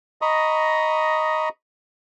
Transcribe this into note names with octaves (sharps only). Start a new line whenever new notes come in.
D#5 A#5 B5 C#6 D#6